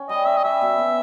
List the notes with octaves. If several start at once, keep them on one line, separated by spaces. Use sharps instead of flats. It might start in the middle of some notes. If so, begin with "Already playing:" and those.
Already playing: C#4
G3 D#5
C#4 E5
D#5
G3 E5
B2
B2